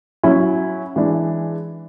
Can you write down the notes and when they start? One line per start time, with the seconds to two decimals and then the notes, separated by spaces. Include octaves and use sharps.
0.23 F#3 C#4 E4
0.96 E3 G#3 D4